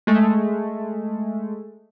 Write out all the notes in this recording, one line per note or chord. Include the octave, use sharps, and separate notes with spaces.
G#3 A3